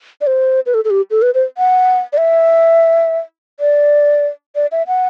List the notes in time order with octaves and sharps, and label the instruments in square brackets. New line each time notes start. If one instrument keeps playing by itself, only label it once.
[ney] D5
C5
B4
A4
A4
G4
A4
B4
C5
F#5
D5
E5
D5
D5
E5
F#5